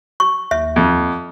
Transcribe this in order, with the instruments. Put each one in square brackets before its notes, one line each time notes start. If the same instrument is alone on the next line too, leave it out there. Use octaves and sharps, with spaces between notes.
[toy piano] C#6
[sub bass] D#2 [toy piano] E5
[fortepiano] F2